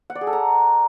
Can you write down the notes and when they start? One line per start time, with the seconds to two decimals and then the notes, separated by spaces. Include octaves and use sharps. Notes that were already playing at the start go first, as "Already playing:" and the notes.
0.10 F#5
0.15 D5
0.21 G#4
0.27 A4
0.33 A#5